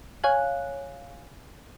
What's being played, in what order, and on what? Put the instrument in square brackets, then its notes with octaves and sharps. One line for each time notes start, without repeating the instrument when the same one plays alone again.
[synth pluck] C#5 F5 G#5 F#6